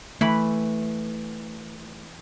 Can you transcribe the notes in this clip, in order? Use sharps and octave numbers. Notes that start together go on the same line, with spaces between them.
E3 A3 B5